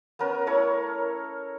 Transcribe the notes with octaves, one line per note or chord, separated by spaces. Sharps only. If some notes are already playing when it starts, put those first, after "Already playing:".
B3 C#4 A#4 B4
A3 E4 A#4 C#5